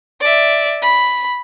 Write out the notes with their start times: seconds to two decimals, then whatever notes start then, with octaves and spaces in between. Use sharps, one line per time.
0.20 D5 E5
0.82 B5